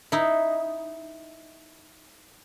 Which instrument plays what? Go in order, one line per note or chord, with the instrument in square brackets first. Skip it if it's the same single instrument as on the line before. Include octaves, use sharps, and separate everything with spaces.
[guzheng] D#4 E4